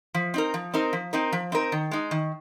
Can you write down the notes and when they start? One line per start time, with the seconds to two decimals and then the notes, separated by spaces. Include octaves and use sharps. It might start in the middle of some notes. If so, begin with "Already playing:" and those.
0.14 F3
0.34 C4 D#4 A#4
0.54 F3
0.74 C4 D#4 A#4
0.93 F3
1.13 C4 D#4 A#4
1.32 F3
1.52 C4 D#4 A#4
1.72 D#3
1.91 G#3 D#4
2.11 D#3